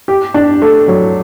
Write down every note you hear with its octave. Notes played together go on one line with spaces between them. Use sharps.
G4
D4
A3
F#3